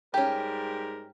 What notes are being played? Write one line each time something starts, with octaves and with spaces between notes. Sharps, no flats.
G#2 G3 C#4 G4 A#4